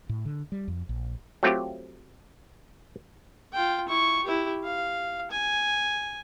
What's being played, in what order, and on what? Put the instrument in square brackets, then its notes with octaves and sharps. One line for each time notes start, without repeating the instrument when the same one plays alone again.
[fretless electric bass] A2
D3
G3
F2
A#1
[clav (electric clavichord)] F#3 A3 C4 F4 G4
[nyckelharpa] F4 G5
E4 C#6
E4 G4
F5
G#5